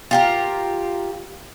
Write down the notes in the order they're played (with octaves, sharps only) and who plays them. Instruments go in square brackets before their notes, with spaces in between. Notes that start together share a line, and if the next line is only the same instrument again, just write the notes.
[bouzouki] F4 G4 A#4